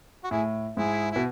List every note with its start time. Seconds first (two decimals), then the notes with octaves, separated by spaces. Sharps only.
0.24 F#4
0.31 A2 E4 G#4
0.77 G#2 E4 G#4
1.11 B2 E4